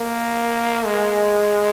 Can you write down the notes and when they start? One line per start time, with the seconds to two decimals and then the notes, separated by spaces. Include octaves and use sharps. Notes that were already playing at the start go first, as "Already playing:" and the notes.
Already playing: A#3
0.85 G#3